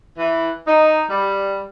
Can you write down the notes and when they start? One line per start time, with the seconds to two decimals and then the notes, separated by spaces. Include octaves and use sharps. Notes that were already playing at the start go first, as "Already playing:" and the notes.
0.19 E3
0.67 D#4
1.10 G3